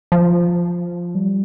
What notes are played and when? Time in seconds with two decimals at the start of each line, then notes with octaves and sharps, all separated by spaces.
0.12 F3
1.15 G3